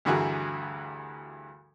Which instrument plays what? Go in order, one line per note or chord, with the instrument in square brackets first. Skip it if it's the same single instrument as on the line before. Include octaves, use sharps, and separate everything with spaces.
[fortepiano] D2 G2 E3 F#4 G#4 A#4